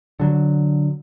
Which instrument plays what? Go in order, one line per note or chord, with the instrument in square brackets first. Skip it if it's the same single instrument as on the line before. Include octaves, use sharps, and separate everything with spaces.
[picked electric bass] D3 F#3